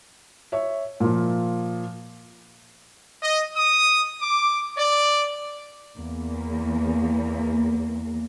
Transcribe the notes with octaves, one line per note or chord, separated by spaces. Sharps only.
C#5 E5
A#2 F3
D#5
D#6
D6
D5
E2 A#3